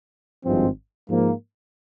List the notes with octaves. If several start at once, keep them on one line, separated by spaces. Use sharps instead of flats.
G#1 G2 F3 G#3 C4
G#2 F3 A#3